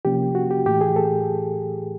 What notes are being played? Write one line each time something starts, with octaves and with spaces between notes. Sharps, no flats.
C3 F3 A#3 C#4 G4
F#4
G4
A2 E3 A3 G4
G#4
A4